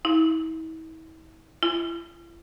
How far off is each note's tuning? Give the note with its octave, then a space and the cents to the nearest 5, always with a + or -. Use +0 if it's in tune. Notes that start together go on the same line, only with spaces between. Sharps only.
E4 -40
E4 +45